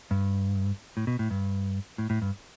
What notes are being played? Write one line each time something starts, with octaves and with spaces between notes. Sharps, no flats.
G2
A2
B2
A2
G2
A2
A2
G2